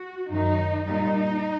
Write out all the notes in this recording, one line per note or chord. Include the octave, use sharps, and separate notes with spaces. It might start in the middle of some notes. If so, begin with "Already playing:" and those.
Already playing: F#4
F#2 D#3 F#3 D#4
A#2 G3 D#4